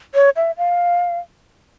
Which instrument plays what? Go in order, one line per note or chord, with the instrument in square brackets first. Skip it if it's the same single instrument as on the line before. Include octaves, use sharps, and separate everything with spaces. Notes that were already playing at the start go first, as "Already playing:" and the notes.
[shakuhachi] C#5
E5
F5